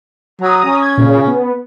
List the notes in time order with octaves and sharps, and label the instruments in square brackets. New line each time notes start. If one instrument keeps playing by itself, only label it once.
[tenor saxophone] F#3 [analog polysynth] A#5 D#6
[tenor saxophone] C#4
[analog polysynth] G#6
A#2 C#3
B3